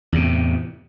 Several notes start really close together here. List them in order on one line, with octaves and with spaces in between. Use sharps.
E2 C3 A2